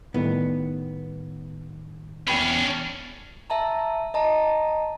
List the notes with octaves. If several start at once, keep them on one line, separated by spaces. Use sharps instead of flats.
A2 D#3 G3 B3
E2 C#4 D4 G5 B5
E5 A5 A#5
D#5 A5 A#5